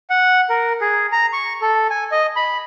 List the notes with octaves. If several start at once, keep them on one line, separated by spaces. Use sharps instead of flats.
F#5
A#4
G#4
A#5
C#6
A4
G#5
D#5
B5